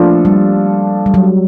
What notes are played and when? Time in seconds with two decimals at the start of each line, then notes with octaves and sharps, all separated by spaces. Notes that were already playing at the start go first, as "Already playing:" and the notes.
Already playing: F3 A3 A#3 D4 F4 A4
0.25 G3
1.06 G3
1.14 F#3